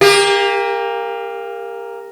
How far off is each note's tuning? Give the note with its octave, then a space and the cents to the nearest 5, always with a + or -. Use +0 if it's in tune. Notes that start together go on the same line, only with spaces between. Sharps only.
A#3 +0 G4 +35